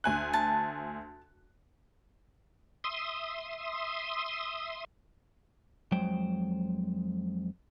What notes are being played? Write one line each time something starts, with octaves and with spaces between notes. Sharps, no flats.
D2 G#5 F#6
A5
E5 C6 D#6
F2 F#3 G#3 C5 G5